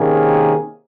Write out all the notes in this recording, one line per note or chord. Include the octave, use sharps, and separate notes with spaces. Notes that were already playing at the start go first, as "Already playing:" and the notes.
Already playing: C3 D#3 A#3 C#4 G#4